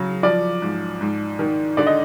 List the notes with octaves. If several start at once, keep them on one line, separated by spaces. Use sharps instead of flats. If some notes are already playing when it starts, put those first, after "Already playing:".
Already playing: C#3 F#3
F3 D5
G#2
G#2
D#3
D3 D5
D#5